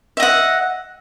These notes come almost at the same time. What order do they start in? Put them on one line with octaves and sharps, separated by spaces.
E5 D#5 F#5